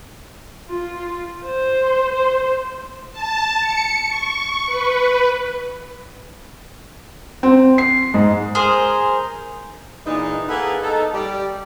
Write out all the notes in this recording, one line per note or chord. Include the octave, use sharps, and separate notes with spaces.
F4
C5
C5
A5
C#7
C#6
B4
C4
C7
G#2
G#4 A#4 C5
A#2 E3 G#3 D4 D#4
A#3 B3 E4 G#4 A4 B4
D#4 A4
G3 G4 D5